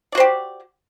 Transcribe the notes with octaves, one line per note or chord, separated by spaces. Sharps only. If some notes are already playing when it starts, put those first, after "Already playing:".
F#4 G4 C5 D5